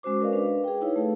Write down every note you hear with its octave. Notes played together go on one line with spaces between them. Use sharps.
G#3 C#4 F#4 C5 D6
A#4 B4 D5 D#5 F5
D4 B4
G#4 G5
D#4 E4 B4 C#5 F5
A3 G#4 A4